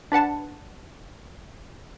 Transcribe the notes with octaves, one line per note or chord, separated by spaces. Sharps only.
D4 B4 F#5 A5